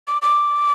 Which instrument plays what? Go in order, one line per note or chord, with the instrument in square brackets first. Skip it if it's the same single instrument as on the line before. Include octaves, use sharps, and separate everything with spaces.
[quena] D6
D6